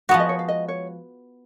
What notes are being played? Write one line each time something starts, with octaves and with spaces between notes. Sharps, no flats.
F3 G#3 B3 F#4 F#5
D#5
C#5
F5
D#5
C#5